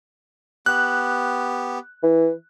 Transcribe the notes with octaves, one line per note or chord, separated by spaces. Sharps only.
B3 G4 F#6
E3